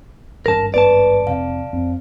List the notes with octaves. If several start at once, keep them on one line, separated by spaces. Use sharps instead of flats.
G#1 G2 C#4 A#4 A5
B3 B4 D5 A5
F1 C3 F5
F2 C4